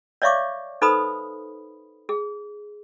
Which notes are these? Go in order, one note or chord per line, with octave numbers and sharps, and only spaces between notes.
C#5 D5 E5 F5 C#6 D6
D#4 A4 B4 C5 B5 D#6
G#4